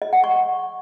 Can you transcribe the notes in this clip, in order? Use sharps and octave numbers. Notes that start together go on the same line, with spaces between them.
D#5
F#5
C#6